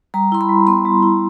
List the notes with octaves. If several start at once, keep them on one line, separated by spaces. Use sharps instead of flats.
G3 A#5
E4 C6
B5
G3
B3 C6
G3
E4